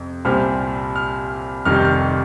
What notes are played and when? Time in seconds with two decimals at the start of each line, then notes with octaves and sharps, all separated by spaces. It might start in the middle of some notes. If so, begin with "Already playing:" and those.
Already playing: F2 C3
0.25 C2 A#2 G3 C4 F6
0.96 F6
1.65 F1 F2 D#3 G3 F6
1.75 G6
1.85 F6